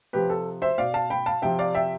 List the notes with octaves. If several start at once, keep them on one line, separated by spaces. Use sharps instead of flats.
C3 F3 G4 B4
A4
C5 E5
B2 D5 F5
F5 A5
G5 B5
F5 A5
C3 F3 E5 G5
D5 F5
E5 G5